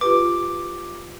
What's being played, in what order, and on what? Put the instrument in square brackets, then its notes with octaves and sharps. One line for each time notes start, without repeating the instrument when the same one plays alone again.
[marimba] F4 G4 B4 [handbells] D6